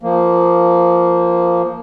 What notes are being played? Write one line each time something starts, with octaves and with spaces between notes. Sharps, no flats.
F3 A#3